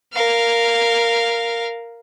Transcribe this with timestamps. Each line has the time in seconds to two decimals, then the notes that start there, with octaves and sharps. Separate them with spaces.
0.13 A#4 F5